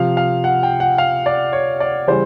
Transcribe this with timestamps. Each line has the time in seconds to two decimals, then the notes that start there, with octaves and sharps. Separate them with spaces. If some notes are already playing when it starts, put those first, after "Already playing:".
Already playing: C3 F3 F5
0.17 F5
0.44 F#5
0.63 G5
0.80 F#5
0.98 F5
1.26 D5
1.53 C#5
1.80 D5
2.07 C#3 E3 G3 C5